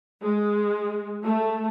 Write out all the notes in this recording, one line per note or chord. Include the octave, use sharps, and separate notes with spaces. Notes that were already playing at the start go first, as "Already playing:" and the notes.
G#3
A3